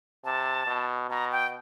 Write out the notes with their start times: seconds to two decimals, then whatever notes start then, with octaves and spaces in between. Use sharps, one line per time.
0.25 C3 A5
0.67 B2
1.10 B2 A#5
1.32 G5